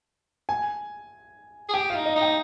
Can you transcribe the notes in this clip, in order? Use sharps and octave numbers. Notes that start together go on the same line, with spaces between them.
G#5
G#4
G4 G5
F4 F5
D#4
D#5
D#4
G5